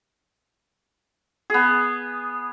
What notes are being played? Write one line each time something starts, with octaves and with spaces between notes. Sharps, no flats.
B3 G#4